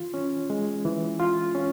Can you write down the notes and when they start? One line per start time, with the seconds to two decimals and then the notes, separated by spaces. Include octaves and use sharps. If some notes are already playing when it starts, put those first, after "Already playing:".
Already playing: E3 F4
0.14 C#4
0.50 G#3
0.85 E3
1.19 F4
1.55 C#4